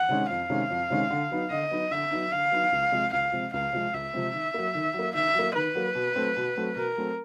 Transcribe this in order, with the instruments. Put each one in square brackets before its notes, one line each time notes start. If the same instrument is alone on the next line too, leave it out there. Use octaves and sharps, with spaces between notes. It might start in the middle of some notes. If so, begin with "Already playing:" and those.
Already playing: [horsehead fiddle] F#5
[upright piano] C3 D#3 G#3 C#4
[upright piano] F2 [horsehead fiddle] F5
[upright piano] C3 D#3 G#3 C#4
F2
C3 D#3 G#3 C#4
D3
F#3 B3 D#4
[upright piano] D3 [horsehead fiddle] D#5
[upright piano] F#3 B3 D#4
[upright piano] D3 [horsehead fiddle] E5
[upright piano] F#3 B3 D#4
[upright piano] D3 [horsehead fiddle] F5
[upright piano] F#3 B3 D#4
C#2
C3 F3 G#3 C4
[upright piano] C#2 [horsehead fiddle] F5
[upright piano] C3 F3 G#3 C4
[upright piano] C#2 [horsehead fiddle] F5
[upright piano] C3 F3 G#3 C4
[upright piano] C#2 [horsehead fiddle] E5
[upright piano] C3 F3 G#3 C4
D#3
F#3 A#3
D#3
F#3
A#3
[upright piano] D#3 [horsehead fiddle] E5
[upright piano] F#3 A#3
[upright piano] D#3 [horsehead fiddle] B4
[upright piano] F#3 A#3
B2
F#3 A3 C4
B2
F#3 A3 C4
[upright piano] B2 [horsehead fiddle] A#4
[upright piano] F#3 A3 C4